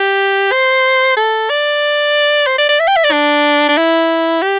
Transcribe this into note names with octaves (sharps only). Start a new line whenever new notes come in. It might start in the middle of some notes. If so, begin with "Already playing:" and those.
Already playing: G4
C5
A4
D5
C5
D5
D5
E5
G5
E5
D5
D4
D4
E4
G4